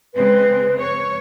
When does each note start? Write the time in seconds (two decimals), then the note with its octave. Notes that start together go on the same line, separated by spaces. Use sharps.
0.15 C#3 G#3 C4 B4
0.80 C#5 C#6